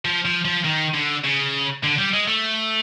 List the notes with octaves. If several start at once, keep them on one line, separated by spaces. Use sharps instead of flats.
F3
F3
F3
D#3
D3
C#3
D3
G3
G#3
A3